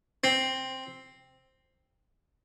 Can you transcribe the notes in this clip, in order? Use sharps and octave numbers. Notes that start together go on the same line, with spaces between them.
C4